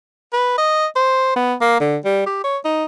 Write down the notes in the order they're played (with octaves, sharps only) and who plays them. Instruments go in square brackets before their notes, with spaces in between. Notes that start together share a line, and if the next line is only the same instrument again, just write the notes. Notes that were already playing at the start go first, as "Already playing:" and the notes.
[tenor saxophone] B4
D#5
C5
B3
A#3
D3
G3
G4
C#5
D#4